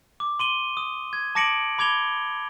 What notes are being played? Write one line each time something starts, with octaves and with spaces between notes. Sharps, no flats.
D6
C6 D#7 G7
D#6
G#6
A5 D6 A#6 C#7 D7 F#7
B5 D6 G#6 F7 G7